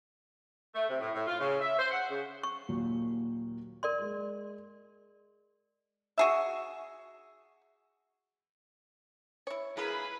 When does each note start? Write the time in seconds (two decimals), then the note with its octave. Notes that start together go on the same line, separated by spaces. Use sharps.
0.74 A3
0.88 C3
1.00 A2
1.13 A2
1.26 F4
1.39 C#3
1.61 E5
1.77 C5
1.90 F#5
2.09 C#3
2.43 C#6
2.69 D#2 A#2 F#3
3.83 A#4 D5 C6
4.00 G#3
6.18 F#4 G#4 E5
9.47 E4 C#5
9.77 A#3 E4 G#4 A#4 B4 B5